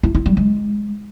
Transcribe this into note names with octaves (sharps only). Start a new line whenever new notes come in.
E4
E4
G3
G#3